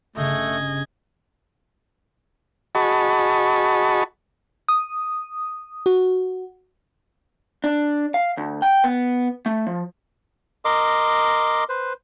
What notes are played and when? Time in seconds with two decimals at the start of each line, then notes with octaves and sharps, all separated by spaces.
0.16 G1 C#3 A3 D#5 G#6
2.75 F#4 G#4 D#5 A5 B5 C#6
4.68 D#6
5.86 F#4
7.64 D4
8.14 F5
8.37 D2
8.62 G5
8.84 B3
9.46 A3
9.67 F3
10.65 A#4 D#5 C6 D6
11.69 B4 C5